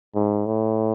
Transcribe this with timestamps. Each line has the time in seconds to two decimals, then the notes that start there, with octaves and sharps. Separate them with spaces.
0.15 G#2
0.46 A2